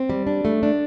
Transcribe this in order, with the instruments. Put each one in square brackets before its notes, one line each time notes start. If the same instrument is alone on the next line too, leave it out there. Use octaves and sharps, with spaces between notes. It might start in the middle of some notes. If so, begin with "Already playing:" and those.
Already playing: [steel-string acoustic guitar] C4
G3
D4
A3
D4